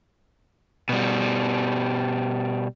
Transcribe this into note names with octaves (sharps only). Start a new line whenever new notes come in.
B2 G3